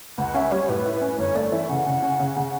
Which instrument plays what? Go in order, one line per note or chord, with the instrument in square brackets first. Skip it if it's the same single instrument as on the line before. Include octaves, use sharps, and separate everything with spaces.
[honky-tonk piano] C#2 [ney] F#5
[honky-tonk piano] C#4 [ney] E5
[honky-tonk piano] G3 [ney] C#5
[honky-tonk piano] A2 [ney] B4
[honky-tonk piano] E4
[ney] B4
[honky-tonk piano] C#4
[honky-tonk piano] G1 [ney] C#5
[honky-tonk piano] A3 [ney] D5
[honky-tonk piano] E3 [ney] E5
[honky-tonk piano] C#3 [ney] F#5
[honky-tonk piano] C#3
C#4
C#3
C#3